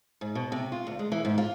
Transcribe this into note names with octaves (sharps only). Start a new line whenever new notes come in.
G#2
B2
C3
F4
D2
G#3
E3
G#2
F4